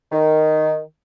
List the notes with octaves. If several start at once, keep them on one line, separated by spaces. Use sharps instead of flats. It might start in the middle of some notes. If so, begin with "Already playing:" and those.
D#3